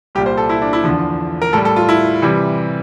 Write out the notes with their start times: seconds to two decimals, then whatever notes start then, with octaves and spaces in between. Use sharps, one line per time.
0.15 C2 A#2 G3 G4
0.26 C5
0.37 A4
0.50 E4
0.62 D4
0.73 E4
0.84 E2 D3 F3
1.42 A#4
1.53 A2 G3 A4
1.65 A4
1.76 F4
1.89 E4
2.22 C3 E3 G3